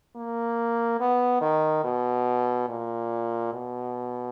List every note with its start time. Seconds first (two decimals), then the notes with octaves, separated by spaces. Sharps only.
0.16 A#3
1.00 B3
1.42 D#3
1.84 B2
2.69 A#2
3.53 B2